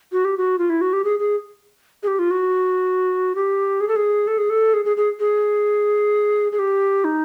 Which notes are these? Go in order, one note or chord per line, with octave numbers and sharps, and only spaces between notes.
F#4
G4
F#4
F4
E4
F#4
G4
G#4
G#4
G#4
G4
F4
F#4
G4
G#4
A4
G#4
A4
G#4
A4
G#4
G#4
G#4
G#4
G#4
G4
D#4